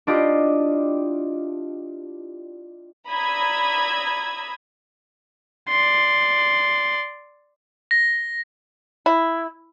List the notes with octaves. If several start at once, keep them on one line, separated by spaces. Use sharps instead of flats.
D4 E4 F4 G4 D5 D#5
D5 A#5 B5 D#6 E6 G#6
D5 C6
A#6
E4